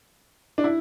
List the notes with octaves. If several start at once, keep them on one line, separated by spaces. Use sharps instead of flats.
D4
E4